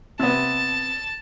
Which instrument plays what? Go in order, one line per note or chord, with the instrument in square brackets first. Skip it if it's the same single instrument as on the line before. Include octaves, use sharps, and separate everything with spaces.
[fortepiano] C3 B3 [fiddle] A5